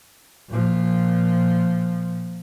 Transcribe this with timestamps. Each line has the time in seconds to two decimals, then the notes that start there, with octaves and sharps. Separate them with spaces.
0.49 A#2 F3